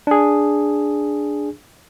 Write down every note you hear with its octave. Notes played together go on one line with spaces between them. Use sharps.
D4 G#4